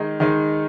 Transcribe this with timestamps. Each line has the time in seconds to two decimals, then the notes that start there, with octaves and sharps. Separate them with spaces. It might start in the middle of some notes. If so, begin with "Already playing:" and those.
Already playing: D#3 G#3 D#4
0.20 D#3 G#3 D#4